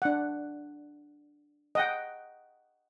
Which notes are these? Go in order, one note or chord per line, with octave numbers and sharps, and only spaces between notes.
D4 F#5
D#5 F#5 G5